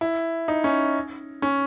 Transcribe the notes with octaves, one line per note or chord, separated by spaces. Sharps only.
E4
D#4
C#4
C#4